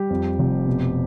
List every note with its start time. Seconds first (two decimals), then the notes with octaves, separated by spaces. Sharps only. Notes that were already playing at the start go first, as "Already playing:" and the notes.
Already playing: G3 G4
0.10 F2
0.39 F1
0.67 B2